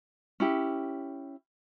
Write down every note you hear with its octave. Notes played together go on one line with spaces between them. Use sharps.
C#4 E4 G4